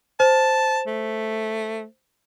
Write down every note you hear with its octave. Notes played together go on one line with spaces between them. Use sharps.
C5 A5
A3